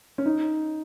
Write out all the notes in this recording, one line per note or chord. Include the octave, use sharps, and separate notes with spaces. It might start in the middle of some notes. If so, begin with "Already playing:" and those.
C#4
D#4